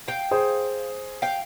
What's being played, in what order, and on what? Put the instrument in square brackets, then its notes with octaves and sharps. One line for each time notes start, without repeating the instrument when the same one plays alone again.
[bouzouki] F5 G5
[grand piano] G#4 C5
[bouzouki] F5 G5